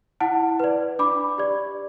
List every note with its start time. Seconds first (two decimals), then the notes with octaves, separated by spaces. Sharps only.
0.20 E4 F#5 A5
0.60 B4 D5
0.99 D4 B5 D6
1.38 G4 D5